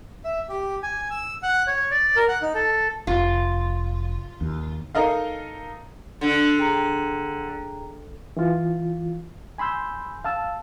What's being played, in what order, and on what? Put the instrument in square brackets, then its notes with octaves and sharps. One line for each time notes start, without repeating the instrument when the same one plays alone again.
[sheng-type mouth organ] E5
G4
G#5
E6
F#5
C#5
D5
A#4
F#5
D#4
A4
[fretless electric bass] F1 [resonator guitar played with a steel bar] F4
[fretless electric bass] D#2
[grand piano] D#4 A4 A#4 D#5 F5
[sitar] D3
[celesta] G#4 G5 A#5
[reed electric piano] E3 F4
G#5 B5 C6 E6 G6
F5 A5 E6